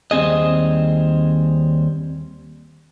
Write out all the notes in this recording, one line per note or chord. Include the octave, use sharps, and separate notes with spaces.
D#2 G3 C4 G#4 D#5